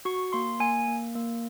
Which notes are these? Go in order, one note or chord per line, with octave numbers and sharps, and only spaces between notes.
F#4 C#6
A#3 C6
A#3 G#5
A#3
A#3